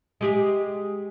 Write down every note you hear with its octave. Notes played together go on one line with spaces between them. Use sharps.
G#3 G4 G#4